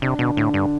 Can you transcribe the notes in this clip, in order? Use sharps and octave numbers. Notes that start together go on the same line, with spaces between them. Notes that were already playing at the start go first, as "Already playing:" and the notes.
C3 D4
B2 D3
A2 D3
G2 D4